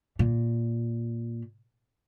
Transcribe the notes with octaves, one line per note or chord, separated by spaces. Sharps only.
A#2